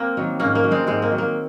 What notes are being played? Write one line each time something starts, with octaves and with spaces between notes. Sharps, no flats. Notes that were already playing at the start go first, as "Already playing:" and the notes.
Already playing: A#3 C4
D#3 F#3
G#2 A#3 C#4
A#3
D#3 F#3
G#3 C4
G#2 G#3 C4
A#3
D#3 F#3
A#3